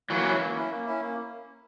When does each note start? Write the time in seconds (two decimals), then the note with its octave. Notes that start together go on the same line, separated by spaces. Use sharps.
0.09 E3 F#3 A#3
0.25 C#4 E4
0.39 A#3
0.56 C#4 E4
0.71 A#3
0.85 C#4 E4
1.01 A#3